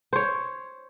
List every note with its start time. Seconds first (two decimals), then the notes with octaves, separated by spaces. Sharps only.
0.13 C5 C#5